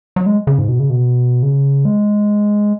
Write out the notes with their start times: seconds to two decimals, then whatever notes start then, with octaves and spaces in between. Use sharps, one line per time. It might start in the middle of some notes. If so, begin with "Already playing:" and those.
0.16 F#3
0.26 G#3
0.47 C#3
0.58 G#2
0.69 B2
0.79 C#3
0.90 B2
1.42 C#3
1.85 G#3